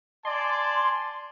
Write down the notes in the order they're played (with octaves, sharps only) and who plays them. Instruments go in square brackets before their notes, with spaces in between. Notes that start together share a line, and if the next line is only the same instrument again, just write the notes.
[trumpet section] D5 G#5 A5 [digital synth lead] C6